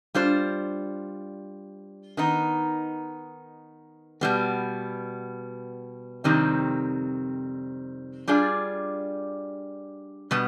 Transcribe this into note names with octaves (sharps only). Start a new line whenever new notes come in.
G3 D4 F4 C5
D#3 B3 D#4
B2 G3 B3
F2 C3 D#3 G3 C4
G3 D4 F4 G#4 D5
B2 G3 B3